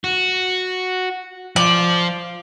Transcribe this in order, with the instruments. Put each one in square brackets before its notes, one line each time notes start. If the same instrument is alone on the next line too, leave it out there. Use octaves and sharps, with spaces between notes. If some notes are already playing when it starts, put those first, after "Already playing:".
[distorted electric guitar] F#4
[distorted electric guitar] F3 F4 [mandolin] D5